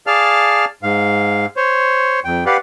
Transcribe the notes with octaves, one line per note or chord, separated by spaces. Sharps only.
G#4 D5 F5 A5 F6
G#2 F5
C5 C#5
F2 G5
G4 B4 D5 F5 F#5